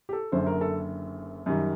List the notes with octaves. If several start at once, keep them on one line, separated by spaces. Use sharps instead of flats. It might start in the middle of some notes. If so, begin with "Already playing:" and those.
G4
A4
F#1 F#2 D3 C5
A#4
A4
F#2 D#3 G3